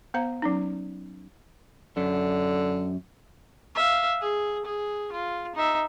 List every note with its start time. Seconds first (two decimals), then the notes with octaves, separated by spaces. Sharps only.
0.14 B3 C5 F5 A#5
0.42 F#3 C#4 D#4
1.97 F#2 D3
3.75 E5 F5
4.21 G#4
4.65 G#4
5.12 F4
5.55 D#4 E5